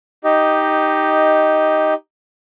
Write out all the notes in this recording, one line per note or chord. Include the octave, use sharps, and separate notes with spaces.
D#4 G4 D#5